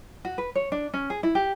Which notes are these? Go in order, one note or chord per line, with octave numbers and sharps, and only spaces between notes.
F#4
B4
C#5
D4
C#4
G#4
E4
G4